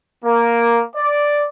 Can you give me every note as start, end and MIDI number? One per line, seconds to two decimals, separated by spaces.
0.25 0.81 58
0.94 1.45 74